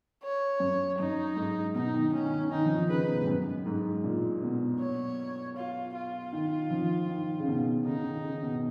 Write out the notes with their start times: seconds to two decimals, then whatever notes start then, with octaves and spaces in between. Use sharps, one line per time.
0.23 C#5
0.60 F#2
0.98 F#2 D#4
1.37 G#2
1.74 B2 D#4
1.93 D#3
2.13 D#3 C#4
2.32 D#3
2.51 D#3 D#4
2.65 F3
2.70 D#3
2.89 C#3 B4
3.08 B2
3.21 G#2
3.27 F#2
3.66 G#2
4.04 A#2
4.43 B2
4.80 C#5
5.57 F4
5.95 F4
6.33 D#3
6.70 F3
7.09 D#3
7.39 C#3
7.48 B2
7.85 C#3 D#4
8.04 D#3
8.24 C#3
8.43 B2